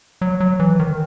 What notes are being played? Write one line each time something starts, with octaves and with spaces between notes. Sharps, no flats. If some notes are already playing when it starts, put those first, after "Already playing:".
F#3
F#3
E3
D#3